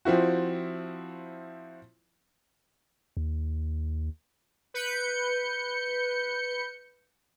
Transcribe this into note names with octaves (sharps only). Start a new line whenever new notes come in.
F3 C4 E4 F#4
D#2
B4 G6 C#7